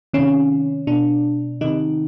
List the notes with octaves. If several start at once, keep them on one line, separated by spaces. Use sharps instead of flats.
C3 D#3 C#4
B2 D4
C3 D#3 D#4